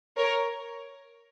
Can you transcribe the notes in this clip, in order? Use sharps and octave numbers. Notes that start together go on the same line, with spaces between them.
A#4 C#5